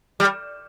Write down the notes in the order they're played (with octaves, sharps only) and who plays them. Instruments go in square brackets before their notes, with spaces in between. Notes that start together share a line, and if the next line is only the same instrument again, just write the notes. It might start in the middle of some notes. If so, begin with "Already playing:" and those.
[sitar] G3